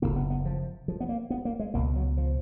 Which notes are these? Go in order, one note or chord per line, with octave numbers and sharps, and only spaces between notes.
F#1 F2 C#3 A#3
B3
B3
F3
F3
B3
A#3
B3
A#3
G#3
C#2 B2 A#3
F#3
F3